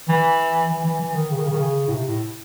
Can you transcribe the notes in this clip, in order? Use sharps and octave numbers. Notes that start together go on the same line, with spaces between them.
E3
E3
E3
E3
D#3
C#3
D#3
C#3
D#3
C#3
A2
C3
A2